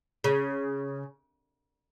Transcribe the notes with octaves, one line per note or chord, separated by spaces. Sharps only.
C#3